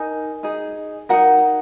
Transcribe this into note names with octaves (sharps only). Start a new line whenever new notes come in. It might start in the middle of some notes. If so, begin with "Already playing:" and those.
Already playing: D#4 A#4 G#5
D#4 G#4
D#4 F#4 A#4 F#5